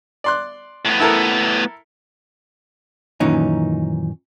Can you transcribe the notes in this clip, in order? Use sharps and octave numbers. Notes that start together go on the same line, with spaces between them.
D5 C6 F#6
A2 B3
E4 A4 A#4
F#2 A#2 D#3 E3 C#4 D#4